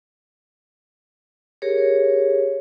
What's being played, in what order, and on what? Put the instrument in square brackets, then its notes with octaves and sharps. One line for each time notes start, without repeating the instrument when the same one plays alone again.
[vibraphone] G4 G#4 A#4 C#5